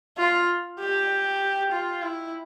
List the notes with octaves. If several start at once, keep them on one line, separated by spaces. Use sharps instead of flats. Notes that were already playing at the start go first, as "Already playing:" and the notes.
F4
G4
F4
E4